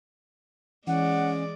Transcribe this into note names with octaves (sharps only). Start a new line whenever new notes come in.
E3 G#3 C#4 D5 F#5